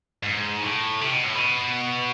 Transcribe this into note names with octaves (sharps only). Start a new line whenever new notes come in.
G#2
A2
C3
B2
A2
B2